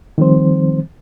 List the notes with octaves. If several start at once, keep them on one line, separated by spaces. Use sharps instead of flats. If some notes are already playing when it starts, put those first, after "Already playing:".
D#3 F3 G3 C4 C5